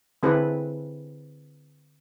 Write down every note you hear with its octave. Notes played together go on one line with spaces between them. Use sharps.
D3 C4 E4 G#4 A4 B4